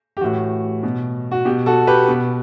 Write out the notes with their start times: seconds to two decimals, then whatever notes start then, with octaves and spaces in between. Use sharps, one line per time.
0.17 G4
0.21 A2 E3 F#4
0.83 B2
1.32 F#4
1.45 B2 G4
1.66 F#4 A4
1.87 G4 B4
2.08 B2